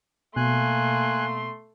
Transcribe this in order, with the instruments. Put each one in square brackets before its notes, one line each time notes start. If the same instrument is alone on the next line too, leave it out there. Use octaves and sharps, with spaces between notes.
[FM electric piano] B2 [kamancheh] A3 C6 [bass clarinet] A#3 [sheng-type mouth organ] G#5 F#6